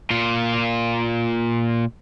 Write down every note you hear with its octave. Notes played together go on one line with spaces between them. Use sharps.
A#2 F4